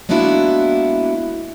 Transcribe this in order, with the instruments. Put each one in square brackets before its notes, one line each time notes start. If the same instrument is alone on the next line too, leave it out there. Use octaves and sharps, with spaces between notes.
[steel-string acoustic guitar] G#3 A#3 B3 D4 E4 F#4